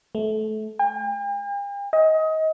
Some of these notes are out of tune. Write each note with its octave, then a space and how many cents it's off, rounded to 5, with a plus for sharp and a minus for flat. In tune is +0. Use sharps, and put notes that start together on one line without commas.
A3 -25
G5 +45
D#5 +25